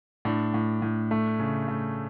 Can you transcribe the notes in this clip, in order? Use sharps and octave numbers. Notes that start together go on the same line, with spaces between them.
A2 D4
A2
A2
A3
C#3
A3